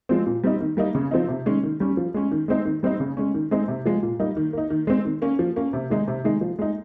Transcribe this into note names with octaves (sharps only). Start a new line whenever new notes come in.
F3 G#3 C4
A#2
G3 C4 D#4
D#3
G3 A#3 D#4
C#3
F3 C4 D#4
C3
D#3 G#3 C#4
D#3
G3 C#4
F3
G#3 C#4
D#3
G#3 C4 D#4
D#3
G3 C4 D#4
C#3
G#3 C#4
D#3
G#3 C4 D#4
C3
F3 G#3
A#2
G3 A#3 D#4
D#3
A#3 D#4
D#3
G#3 C4
D#3
A#3 C#4
F3
A#3 C#4
C3
D#3 G#3 D#4
C3
D#3 G#3 D#4
F3
G#3 D#4